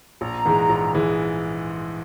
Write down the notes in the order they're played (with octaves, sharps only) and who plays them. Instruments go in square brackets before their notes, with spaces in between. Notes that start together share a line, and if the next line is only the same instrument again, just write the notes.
[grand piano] A#1 [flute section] A#5
[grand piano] G#2 E3 G#3
A#1
E3 G#3